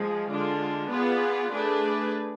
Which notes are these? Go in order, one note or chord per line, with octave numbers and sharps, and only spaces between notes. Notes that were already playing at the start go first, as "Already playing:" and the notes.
Already playing: F3 G#3 G#4
D3 G#3 D4 F4
B3 F4 G#4 B4 D5
A3 D4 G#4 B4 D5